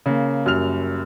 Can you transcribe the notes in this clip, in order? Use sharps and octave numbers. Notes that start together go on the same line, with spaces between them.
C#3 A#3
F#1 F#2 G3 F6 F7